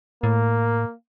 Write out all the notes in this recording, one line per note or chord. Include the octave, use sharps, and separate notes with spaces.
A2 A#3